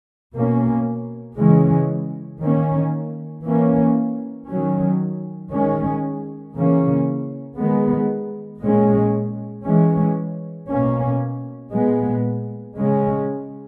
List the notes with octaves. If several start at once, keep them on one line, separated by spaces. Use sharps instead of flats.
B2 A#3 C#4
C#3 E3 G#3 C#4
D#3 A#3 C#4
E3 A#3 C#4
D#3 F#3 C#4
D#3 G#3 C#4
C#3 E3 A#3 C#4
D#3 G#3 B3
A#2 G#3 C#4
E3 G#3 C#4
B2 A#3 C#4
A#2 G#3 B3
C#3 G#3 C#4